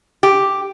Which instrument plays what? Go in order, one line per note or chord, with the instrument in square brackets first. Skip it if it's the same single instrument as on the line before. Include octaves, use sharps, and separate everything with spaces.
[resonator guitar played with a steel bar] G4